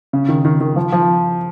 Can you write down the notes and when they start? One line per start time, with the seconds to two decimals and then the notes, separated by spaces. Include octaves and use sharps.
0.13 C#3
0.29 D#3
0.45 D#3
0.60 D#3
0.76 F3
0.92 F3